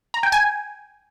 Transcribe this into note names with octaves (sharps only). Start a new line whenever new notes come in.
A#5
G5
G#5